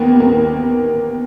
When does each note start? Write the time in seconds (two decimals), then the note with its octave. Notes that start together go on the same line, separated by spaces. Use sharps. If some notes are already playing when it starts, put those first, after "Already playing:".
Already playing: D#2 D#3 A#3 B3
0.20 A#3